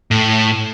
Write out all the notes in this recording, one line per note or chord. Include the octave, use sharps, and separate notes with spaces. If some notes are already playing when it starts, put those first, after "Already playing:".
A2